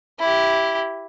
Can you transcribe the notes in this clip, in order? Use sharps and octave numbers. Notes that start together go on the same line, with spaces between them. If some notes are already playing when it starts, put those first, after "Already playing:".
E4 G4